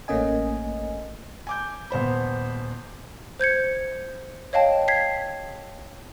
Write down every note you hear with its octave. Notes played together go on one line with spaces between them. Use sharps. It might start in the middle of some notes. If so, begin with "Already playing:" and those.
A1 A3 A#3 C#4 D#5 G#5
G#5 D6 G6
D#1 B3 C5 B5
C5 G6 G#6 C#7
C#5 D#5 F5 G5 A5
G#6 B6 C7